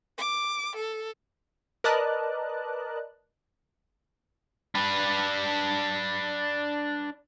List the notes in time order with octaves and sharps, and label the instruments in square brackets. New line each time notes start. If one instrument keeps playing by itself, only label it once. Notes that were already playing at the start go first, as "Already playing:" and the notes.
[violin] D6
A4
[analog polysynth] A#4 B4 D5 D#5 A5 F#6
[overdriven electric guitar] D4 B4